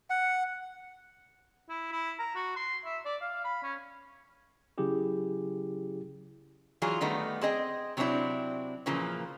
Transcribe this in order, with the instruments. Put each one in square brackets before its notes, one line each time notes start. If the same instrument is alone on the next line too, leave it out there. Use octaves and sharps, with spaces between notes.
[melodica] F#5
[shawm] E4
E4
A#5
F#4
C6
E5
D5
F5
B5
C#4
[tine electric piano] C#3 F#3 C#4 E4 G4 G#4
[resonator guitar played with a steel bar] E3 F#3 F4 G#4
D#3 G3 A3 B3 D#4
C4 G#4 D#5 G5
C3 F#3 B3 C4 D4 E4
A#2 C#3 E3 F3 A#3